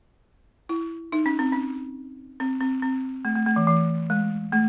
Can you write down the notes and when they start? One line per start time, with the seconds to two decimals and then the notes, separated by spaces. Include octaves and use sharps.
0.69 E4
1.12 D#4
1.26 C#4
1.39 C4
1.52 C#4
2.40 C4
2.61 C4
2.82 C4
3.25 A3
3.36 A3
3.46 A3
3.56 E3
3.67 E3
4.10 G#3
4.52 A3